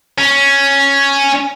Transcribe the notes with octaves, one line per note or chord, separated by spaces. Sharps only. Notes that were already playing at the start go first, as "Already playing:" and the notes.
C#4